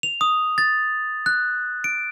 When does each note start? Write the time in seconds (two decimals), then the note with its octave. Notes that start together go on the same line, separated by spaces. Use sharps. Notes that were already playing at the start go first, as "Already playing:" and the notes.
0.03 F7
0.21 D#6
0.58 A6
1.26 F#6
1.84 D7